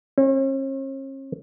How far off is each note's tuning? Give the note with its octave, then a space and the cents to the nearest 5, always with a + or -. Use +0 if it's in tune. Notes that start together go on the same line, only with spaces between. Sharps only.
C#4 -45